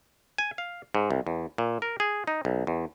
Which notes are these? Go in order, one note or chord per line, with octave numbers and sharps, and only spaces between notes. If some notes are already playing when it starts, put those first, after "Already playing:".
G#5
F5
G#2
C2
E2
A#2
A#4
G#4
D#4
B1
E2